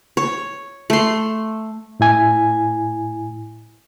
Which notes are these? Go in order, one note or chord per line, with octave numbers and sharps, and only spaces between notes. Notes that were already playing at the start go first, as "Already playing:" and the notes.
C#5
A3 C6
A2 E4 G#5